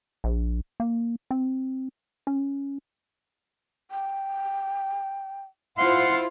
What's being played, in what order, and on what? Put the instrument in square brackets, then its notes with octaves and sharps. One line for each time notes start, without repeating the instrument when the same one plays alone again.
[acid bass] A#1
A#3
C4
C#4
[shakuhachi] G5
[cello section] E4 F4 C5 [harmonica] F5 F#5 C6